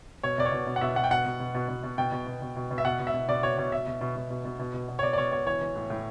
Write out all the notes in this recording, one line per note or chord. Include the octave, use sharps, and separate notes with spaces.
B2 C#5
B2 D5
C#5
B2
B2
F#5
B2 E5
B2 F#5
G5
B2 F#5
B2
B2
B2
B2
B2
B2 G5
B2
B2
B2
B2
B2
E5
B2 F#5
B2
E5
B2
B2 D5
B2 C#5
B2 C#5
B2 E5
B2
B2
B2
B2
B2
B2
B2
B2
C#5
B2 D5
D5
B2 C#5
B2 C#5
E3 C#5
E3
A2
A2